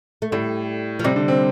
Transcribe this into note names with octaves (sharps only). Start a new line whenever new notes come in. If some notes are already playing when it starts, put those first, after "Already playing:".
A3
A2 G3
F3
C3 G3
D3
C4